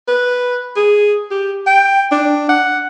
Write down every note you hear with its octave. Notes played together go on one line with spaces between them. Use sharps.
B4
G#4
G4
G5
D4
F#5